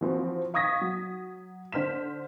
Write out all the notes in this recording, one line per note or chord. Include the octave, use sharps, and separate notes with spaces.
E3 F3 C4 F#4
F5 C#6 D#6 G#6 A#6 B6
F#3
D3 C5 F6 B6 E7